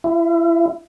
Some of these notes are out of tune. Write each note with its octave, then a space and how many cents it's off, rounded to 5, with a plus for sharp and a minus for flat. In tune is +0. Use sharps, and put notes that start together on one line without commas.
E4 +30